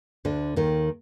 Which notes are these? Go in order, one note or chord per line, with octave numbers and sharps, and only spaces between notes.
D2 D3
D#2 D#3